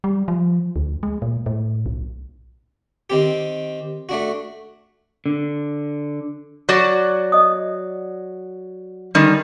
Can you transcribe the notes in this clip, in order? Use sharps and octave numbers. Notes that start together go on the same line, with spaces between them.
G3
F3
D2
G#3
A#2
A2
B1
D#3 C4 G4
A3 D4 F#4
D3
F#3 F#4 D5
D#5 D#6
D3 D#3 G3